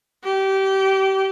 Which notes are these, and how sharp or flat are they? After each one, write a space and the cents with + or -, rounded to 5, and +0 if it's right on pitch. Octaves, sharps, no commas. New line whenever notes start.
G4 -25